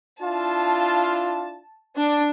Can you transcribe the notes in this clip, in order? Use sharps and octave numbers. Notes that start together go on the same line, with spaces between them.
D4 E4 F4 A5
D4